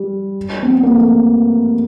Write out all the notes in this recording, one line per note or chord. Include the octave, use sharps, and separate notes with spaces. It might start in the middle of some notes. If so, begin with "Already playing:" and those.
Already playing: G3
C4
B3
A#3
A3